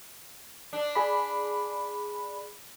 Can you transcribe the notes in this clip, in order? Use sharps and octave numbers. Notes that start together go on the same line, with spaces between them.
D4
G#4 D5 B5